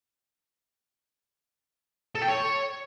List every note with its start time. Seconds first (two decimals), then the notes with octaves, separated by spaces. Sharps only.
2.15 A4
2.22 G5
2.28 C#5